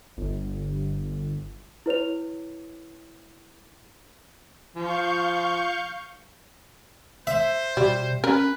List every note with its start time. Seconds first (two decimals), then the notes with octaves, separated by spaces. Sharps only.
0.17 G1
1.86 E4 B4 C#5 F7
4.76 F3 F5 C#6 G6
7.27 C5 E5
7.77 B2 G3
8.24 C#4 A#4 B4